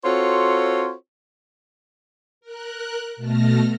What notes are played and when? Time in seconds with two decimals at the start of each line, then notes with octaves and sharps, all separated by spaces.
0.04 C4 F4 F#4 A4 C5 C#5
2.41 A#4 F#6
3.16 B2 A3 A4 F6 A#6